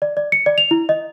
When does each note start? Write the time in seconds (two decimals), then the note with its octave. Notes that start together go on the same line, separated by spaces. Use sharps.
0.02 D5
0.17 D5
0.32 C#7
0.46 D5
0.58 F7
0.71 E4
0.89 D#5